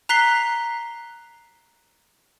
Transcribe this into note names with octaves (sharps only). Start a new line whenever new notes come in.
A#5 F#6 B6 C7 G7